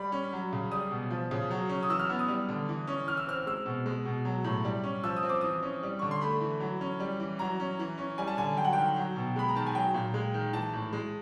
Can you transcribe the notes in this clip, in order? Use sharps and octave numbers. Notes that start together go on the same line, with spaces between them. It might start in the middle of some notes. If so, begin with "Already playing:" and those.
Already playing: G3 B5
C#4
F#3
C#3
G3 D#6
B2
F3
C#3
F#3
C#4
D#6
E3 E6
F6
B3
D#6
G3
D3
E3
C#4
E3 F6
E6
C4 F6
G#3 E6
B2
G#3
B2
F#3
A2
G3
C#4
F3 E6
D#6
C4
D6
E3 D#6
C#4
G3
D3 C#6
C6
A3 B5
E3
F#3
C#4
G3
E3
F#3 A#5
C#4
E3
C#4
G3 G#5
A5
D3 G#5
F#3 G5
F#5
D#3 G5
F#3
B2
G#3 B5
A#5
D#3 A5
G#5
F#3 G5
A#2
G#3
D#3
E3 A5
A2
G#3